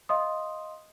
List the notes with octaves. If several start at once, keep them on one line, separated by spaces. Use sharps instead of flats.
D#5 F5 C6 D#6